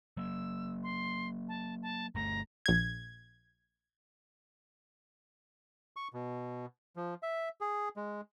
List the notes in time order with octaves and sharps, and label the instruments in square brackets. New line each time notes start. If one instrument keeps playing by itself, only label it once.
[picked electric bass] F#3 A#3 [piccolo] E6
[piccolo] C6
A5
A5
[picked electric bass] G1 A3 [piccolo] A#5
[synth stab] A#1 G#6
[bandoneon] C#6
B2
F3
E5
G#4
G#3